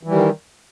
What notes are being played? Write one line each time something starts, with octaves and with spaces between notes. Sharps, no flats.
D#3 E3 G3